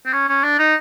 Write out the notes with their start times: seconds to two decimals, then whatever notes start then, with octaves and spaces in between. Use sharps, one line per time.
0.06 C4
0.13 C#4
0.29 C#4
0.44 D4
0.59 D#4